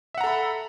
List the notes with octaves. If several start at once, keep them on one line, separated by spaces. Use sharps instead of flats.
A4 E5 F#5 A#5 B5